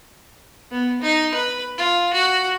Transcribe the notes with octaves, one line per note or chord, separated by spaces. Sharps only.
B3
D#4
B4
F4
F#4